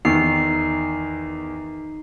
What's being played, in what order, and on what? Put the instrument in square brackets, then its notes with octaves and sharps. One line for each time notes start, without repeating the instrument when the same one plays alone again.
[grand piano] E2 D#3 [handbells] D#4 C7